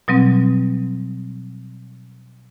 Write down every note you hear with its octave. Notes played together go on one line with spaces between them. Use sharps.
B2 F#3 G3 C4